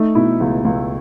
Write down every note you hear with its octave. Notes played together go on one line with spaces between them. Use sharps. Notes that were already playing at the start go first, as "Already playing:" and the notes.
Already playing: A3 D#4
B2 E4
C#2
C#2